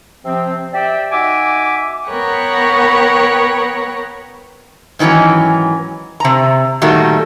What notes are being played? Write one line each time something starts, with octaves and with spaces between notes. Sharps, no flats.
C3 F3 C4
G4 D5 E5 G5
D#4 F#4 E5 G#5 D6
B3 A#4 B4 C#5 F#5 G5
G#2 D#3 E3 F#3 C#4
C3 A#5
A#2 D#3 G3 A3 F#4